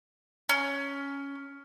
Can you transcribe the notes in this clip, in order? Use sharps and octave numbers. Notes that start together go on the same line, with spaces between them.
C#4